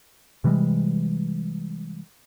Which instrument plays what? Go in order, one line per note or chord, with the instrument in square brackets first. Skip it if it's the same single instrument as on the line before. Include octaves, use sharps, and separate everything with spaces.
[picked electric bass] C3 E3 G3 G#3